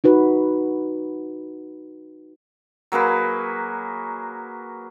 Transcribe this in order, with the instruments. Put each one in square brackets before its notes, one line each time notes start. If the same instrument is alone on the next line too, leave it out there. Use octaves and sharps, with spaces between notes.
[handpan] D#4 F#4 B4
[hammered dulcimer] F#3 A#3 G#4 B4